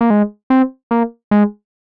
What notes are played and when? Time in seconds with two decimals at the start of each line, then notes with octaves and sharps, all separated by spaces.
0.01 A#3
0.10 G#3
0.50 C4
0.91 A#3
1.31 G#3